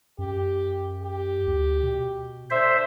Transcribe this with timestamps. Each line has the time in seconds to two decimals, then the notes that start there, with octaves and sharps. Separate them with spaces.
0.18 F#2 G4
1.02 G4
1.47 D2
1.83 B2
2.51 D3 C5 E5